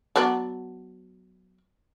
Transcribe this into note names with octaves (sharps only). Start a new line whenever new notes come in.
F#3 B3 D4